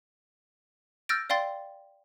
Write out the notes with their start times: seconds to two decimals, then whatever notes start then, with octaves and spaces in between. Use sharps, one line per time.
1.09 E6 F6 G6 A6 A#6 D7
1.30 D5 F5 G5 C6 A6